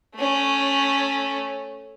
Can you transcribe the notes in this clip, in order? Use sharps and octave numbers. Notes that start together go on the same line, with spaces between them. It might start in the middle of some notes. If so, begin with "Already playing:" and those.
A3 C#4